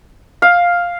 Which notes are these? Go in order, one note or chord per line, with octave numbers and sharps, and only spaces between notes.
F5